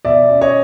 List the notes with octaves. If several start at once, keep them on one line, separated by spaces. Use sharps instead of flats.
B2 D5 E5
C#4
C#5 D#5